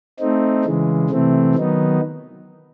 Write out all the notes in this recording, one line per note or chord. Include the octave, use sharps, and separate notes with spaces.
A3 C4 D#4
C#3 E3 G#3
C3 E3 A3 C4
D#3 F#3 B3 D#4